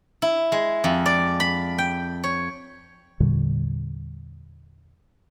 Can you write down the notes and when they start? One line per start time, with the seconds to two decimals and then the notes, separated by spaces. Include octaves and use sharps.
0.22 E4
0.52 G#3
0.84 F2
1.06 D5
1.40 B5
1.78 G5
2.24 C#5
3.20 E2 A#2 D3 G3